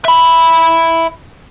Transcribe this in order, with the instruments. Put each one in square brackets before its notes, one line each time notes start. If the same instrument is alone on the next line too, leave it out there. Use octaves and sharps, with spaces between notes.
[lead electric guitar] E5 B5